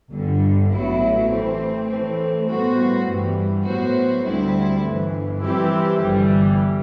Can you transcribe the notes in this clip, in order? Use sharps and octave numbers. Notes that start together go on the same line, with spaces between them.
G1 G2 D3 G3
A1 A2 F#3 B3 E4
E3 A3 C4
A2 E3 A3 C4
A2 G3 B3 F#4 C5
G2 E3 G3
A2 F#3 B3 F#4 C5
D2 D3 G3 C4 E4
G1 G2 E3
E3 G3 C4 E4 G4
G1 G2 E3 G3